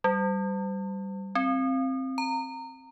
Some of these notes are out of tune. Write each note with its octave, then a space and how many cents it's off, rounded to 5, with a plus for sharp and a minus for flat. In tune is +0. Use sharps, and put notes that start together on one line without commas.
G3 -15
C4 +10
A#5 -25